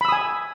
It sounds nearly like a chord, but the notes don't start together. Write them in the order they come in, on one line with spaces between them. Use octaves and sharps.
B5 E6 D#6 G#5